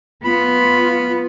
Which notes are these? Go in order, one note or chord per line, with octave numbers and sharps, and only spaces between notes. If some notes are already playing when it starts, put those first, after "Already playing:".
B3 F4 B5